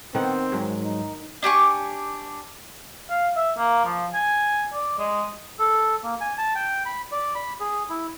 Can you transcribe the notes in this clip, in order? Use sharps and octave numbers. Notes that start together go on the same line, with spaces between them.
D#3 B3 C4 F#5
G#2 F#3 G#3
D#4
D4 G4 G#5 C#6
F5
E5
A#3
F3
G#5
D5
G#3
A4
A#3
G#5
A5
G5
B5
D5
B5
G#4
E4